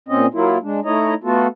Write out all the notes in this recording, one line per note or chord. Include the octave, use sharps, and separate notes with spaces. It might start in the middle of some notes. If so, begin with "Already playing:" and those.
A#2 C4 C#4 D#5
F#3 A#3 E4 F4
G#3 D4
A3 D#4 E4 C#5 D#5 A#5
A3 B3 F4 F#4 A4